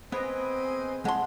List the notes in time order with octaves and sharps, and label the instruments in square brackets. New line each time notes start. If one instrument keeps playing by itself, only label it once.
[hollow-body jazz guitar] B3 [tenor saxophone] C4 [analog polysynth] G#4 B4 D#5
[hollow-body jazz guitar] G#3 C6 [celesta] F#5 A5